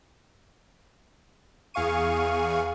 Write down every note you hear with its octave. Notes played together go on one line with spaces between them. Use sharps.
E2 G#4 F5 C#6 D#7